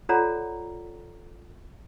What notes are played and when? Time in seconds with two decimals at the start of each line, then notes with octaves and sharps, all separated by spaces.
0.09 F4 A4 C#5 D5 F#5 A#5